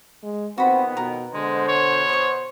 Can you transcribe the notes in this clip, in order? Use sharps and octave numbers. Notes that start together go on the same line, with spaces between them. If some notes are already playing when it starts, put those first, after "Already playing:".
G#3
F2 D#3 B3 C4 F#4 B5
B2 A#4
B2 D3 G#3 C5
C#5
C#6 D#6